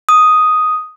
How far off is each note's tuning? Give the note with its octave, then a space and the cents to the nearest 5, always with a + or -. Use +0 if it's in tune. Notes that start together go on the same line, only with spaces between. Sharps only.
D#6 +0